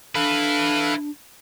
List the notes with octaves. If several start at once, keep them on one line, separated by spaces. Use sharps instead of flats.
D4 E4 A4 B4 F5 F#6